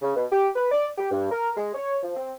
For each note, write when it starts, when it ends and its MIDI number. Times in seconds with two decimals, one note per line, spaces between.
0.02 0.15 49
0.16 0.25 47
0.31 0.49 67
0.56 0.68 71
0.72 0.88 74
0.98 1.09 67
1.11 1.31 43
1.31 1.52 70
1.57 1.71 56
1.74 1.97 73
2.03 2.13 53
2.16 2.31 60